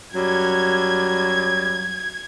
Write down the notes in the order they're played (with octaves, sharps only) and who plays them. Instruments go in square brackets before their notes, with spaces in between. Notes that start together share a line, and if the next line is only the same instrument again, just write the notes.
[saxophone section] F#2 F#3 G3 [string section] G#6